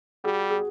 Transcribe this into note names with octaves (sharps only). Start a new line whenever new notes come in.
G3 F#4 G#4
G#4